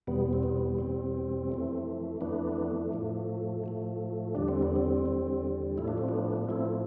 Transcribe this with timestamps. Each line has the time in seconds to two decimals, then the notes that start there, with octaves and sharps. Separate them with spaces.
0.07 E2 B2 G3 B3
0.33 C4
0.43 B3
0.78 E2 B2 G3 C4
1.50 F2 E3 A3
2.21 F2 E3 A3 B3 D4
2.92 A2 F3 A3
3.64 A2 F3 A3
4.35 E2 D3 G3 D4
4.48 C4
4.63 B3
4.76 C4
5.06 E2 D3 G3
5.77 A2 F3 A3 E4
5.88 D4
5.98 C4
6.09 B3 D4
6.49 A2 F3 A3 C4 E4